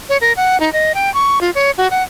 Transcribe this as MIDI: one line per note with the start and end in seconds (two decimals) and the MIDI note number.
0.09 0.17 73
0.21 0.32 70
0.37 0.60 78
0.60 0.72 63
0.73 0.92 75
0.94 1.12 79
1.14 1.39 85
1.41 1.50 65
1.55 1.71 73
1.78 1.87 66
1.91 2.03 78